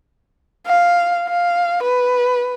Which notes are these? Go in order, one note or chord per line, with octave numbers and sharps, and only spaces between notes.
F5
F5
B4